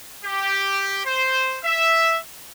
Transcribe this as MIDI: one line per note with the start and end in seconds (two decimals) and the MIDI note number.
0.24 1.01 67
1.06 1.57 72
1.64 2.17 76